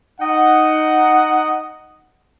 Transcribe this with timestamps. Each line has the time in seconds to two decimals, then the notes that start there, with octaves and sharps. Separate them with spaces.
0.20 D#4 D#5 F#5